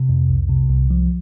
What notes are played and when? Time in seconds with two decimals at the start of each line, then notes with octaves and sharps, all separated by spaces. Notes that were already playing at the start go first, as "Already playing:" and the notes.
Already playing: C3
0.09 F2
0.30 C2
0.49 C3
0.70 C2
0.90 F3